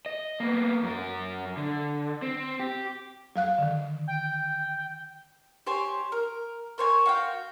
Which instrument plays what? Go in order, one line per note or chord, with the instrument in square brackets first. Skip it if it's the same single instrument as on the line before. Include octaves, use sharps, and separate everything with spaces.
[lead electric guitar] D#5
A#3 B3
F#2 A#4
D3
C4
G4
[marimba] F#3 F5 F#6
D3 D#3
[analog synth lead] G5
[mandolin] G4 C5 C#5 G#5
A#4
A#4 C5 C#5 G#5
F#4 F5 G5